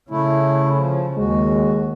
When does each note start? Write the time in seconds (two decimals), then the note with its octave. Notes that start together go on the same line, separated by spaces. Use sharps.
0.10 C#3 A3 E4
0.76 F3
1.18 D#2 G#3 F#4